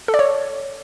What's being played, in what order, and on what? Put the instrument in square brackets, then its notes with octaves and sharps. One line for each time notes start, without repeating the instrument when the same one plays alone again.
[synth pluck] A4
D5
C#5